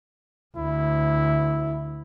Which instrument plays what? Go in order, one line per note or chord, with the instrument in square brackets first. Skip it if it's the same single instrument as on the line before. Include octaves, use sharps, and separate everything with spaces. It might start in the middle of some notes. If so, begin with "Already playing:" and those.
[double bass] D2 [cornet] E4